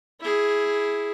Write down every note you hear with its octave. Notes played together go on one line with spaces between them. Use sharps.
E4 G#4